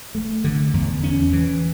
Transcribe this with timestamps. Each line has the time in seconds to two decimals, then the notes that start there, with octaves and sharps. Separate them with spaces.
0.15 A3
0.44 D3
0.74 E2
1.03 C#4
1.33 E3